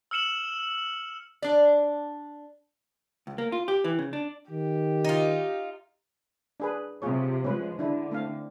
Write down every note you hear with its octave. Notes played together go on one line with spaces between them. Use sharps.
E6 F6 C#7 E7 F#7
D4 D5
C#2
A#3
F4
G4
E3
C#3
D4
D#3 G4
D#4 F4
D4 G#4 B4
C3 F3 F4 G#4 C#5
F3 G#3 C#4 B4
D3 D4 E4
A3 C4 F5